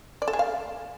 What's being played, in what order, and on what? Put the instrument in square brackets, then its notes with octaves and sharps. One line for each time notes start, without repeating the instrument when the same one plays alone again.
[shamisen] D5
A4
G#4
F5